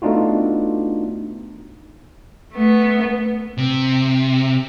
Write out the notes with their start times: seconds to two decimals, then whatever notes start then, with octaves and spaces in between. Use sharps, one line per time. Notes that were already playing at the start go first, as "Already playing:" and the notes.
0.02 A3 B3 D4 D#4 F4 F#4
2.53 A3 B3
3.58 C3